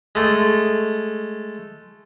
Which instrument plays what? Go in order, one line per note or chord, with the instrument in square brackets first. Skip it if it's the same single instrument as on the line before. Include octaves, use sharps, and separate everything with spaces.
[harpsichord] G#3 A3